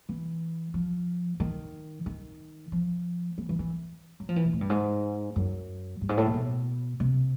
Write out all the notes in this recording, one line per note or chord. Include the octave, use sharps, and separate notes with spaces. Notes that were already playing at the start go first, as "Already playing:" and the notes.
E3
F3
D#3
D#3
F3
E3
E3
E3
F#3
F3
E3
A#2
A2
G2
G#2
F#2
G2
G#2
A2
A#2
B2
C3